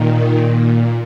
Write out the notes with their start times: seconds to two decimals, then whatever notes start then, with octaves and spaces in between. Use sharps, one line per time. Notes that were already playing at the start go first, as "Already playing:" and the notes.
Already playing: A#2 D#3
0.33 A#2